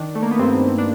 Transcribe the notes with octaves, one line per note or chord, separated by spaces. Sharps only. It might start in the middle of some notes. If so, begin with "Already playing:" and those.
Already playing: D#3 D4
A3
A#3
B3
G2 C4
D4